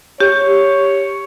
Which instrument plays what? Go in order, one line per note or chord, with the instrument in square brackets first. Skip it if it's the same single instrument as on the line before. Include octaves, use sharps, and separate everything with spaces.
[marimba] G4 [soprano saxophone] C#5